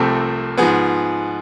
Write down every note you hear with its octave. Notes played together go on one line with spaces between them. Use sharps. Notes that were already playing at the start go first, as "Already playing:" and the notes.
Already playing: C2 C3 F3 A3 C4 A4
G#2 F3 B3 G#4